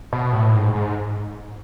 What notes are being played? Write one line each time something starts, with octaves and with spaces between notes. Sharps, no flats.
B2
A2
G#2
G#2